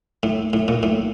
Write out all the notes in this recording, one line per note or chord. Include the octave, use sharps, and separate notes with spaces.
A2
A2
A#2
A2